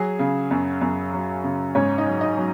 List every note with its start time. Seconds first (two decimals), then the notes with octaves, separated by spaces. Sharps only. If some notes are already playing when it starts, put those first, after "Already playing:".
Already playing: F#3 G#4
0.19 C#3
0.51 F#2
0.81 F#2
1.13 F#3
1.44 C#3
1.75 G#2 C#4 C#5
1.98 D#4 D#5
2.06 F#3
2.21 D#4 D#5
2.37 F#3